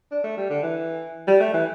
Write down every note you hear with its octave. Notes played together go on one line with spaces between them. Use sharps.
D4
A3
G3
D3
E3
G3
A3
E3